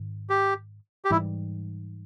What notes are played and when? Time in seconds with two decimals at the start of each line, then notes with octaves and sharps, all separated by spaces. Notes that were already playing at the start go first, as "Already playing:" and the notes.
Already playing: G#2 D#3
0.30 G4
1.05 G4
1.10 G#2 E3 G3 E4